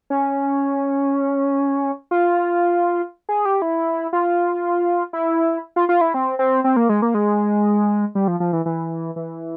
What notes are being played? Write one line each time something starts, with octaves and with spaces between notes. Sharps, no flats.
C#4
F4
G#4
G4
E4
F4
E4
F4
F4
E4
C4
C4
C4
A#3
G#3
A#3
G#3
G3
F3
F3
E3
E3
E3